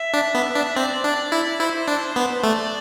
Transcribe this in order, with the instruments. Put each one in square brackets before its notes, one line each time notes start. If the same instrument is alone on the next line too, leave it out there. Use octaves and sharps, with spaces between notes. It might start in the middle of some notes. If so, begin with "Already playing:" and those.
Already playing: [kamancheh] E5
[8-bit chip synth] D4
B3
D4
[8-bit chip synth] C4 [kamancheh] D5
[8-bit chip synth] D4
E4
[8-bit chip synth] E4 [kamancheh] C5
[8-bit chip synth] D4
B3
[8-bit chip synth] A3 [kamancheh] D5